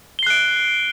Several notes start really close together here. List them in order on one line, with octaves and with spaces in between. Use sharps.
G7 C7 F#6 D7